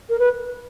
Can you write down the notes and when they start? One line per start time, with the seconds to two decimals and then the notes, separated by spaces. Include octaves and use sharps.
0.09 A#4
0.19 B4